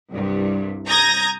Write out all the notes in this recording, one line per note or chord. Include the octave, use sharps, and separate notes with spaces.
C2 G2
A#5 D#6 G6 G#6 A#6